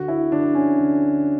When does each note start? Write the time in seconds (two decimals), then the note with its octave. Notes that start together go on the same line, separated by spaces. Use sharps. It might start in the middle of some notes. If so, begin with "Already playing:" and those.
Already playing: D2 F#4
0.08 E4
0.32 D3 D4
0.55 C#4
0.78 D2